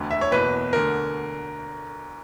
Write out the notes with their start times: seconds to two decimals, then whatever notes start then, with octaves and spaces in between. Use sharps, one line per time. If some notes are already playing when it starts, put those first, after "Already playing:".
Already playing: E1 D2 D3
0.11 E5
0.21 C#5
0.32 F#1 E2 B2 B4
0.73 D2 D3 A#4